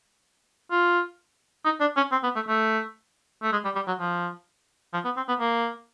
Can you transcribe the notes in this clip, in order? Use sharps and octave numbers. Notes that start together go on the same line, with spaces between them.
F4
D#4
D4
C#4
C4
B3
A3
A3
A3
G#3
G3
G3
F#3
F3
F3
B3
C4
B3
A#3